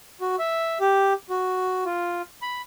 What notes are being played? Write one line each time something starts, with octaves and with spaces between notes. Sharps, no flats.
F#4
E5
G4
F#4
F4
B5